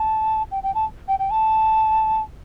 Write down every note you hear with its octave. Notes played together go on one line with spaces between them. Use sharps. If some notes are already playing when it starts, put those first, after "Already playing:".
Already playing: A5
G5
G5
A5
G5
G5
A5